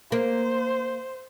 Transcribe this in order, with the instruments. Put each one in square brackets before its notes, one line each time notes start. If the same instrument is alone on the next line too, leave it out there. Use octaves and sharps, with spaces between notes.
[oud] A#3 [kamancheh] C5